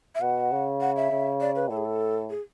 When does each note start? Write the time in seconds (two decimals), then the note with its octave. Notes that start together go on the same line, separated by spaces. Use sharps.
0.15 E5
0.21 B2 F#5
0.52 C#3
0.81 F#5
0.96 E5
1.11 C#3
1.41 D5
1.56 B4
1.70 A2 A4
1.77 G#4
1.85 A4
2.30 G#4